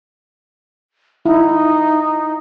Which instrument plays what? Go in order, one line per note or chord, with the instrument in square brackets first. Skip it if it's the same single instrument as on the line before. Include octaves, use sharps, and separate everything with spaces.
[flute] D#4 [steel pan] E4